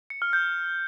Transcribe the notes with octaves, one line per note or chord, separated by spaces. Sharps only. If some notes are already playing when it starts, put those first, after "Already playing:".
C#7
F6
G6